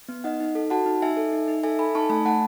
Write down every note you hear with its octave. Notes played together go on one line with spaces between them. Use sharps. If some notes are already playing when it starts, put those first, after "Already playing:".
B3
D#4 D#5 F#5
D#4
A4
F#4 F#5 A5
D#4
D#4 E5 G#5
A4
D#4
D#4
A4 E5 G#5
A4 G#5 B5
D#4 A5 C#6
A3 G#5 B5
A3 F#5 A5